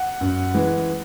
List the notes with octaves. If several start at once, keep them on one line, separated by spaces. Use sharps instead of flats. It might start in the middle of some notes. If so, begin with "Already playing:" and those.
Already playing: F#5
F#2
E3 G#3